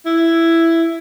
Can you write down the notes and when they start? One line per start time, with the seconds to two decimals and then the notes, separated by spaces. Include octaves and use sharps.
0.06 E4